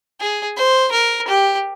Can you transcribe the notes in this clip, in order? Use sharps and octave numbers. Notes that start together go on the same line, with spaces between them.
G#4
C5
A#4
G4